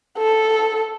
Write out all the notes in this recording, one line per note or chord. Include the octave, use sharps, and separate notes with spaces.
A4